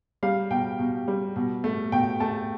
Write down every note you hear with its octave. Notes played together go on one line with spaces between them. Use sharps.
G3 F5
B2 G5
B2
G3
B2
A3
B2 G5
A3 A5